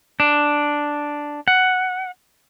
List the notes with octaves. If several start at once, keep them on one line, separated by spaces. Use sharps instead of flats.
D4
F#5